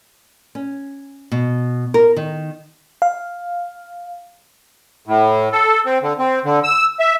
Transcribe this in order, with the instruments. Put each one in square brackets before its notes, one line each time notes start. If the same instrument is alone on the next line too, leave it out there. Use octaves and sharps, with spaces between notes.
[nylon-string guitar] C#4
B2
A#4
D#3
[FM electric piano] F5
[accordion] A2
A4
C4
D3
C4
D3
E6
E5